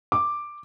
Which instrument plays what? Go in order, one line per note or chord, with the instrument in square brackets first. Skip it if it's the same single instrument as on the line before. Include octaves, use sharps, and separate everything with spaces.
[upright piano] D6